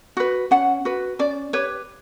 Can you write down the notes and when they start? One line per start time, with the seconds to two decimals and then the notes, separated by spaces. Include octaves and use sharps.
0.17 F#4 B4
0.51 C#4 F#5
0.85 F#4 B4
1.19 C#4 D5
1.53 G4 B4 C#5